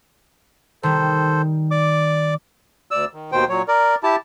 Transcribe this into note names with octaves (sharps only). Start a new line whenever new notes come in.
D#3 G3 A4 C5
D5 D6
D2 D5 E6
D#3
D#2 B2 D#3 C5 G5
A#2 F#3 C#5
A#4 D5
E4 G4 A5